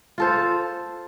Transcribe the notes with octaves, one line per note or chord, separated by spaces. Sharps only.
F4 A4 C5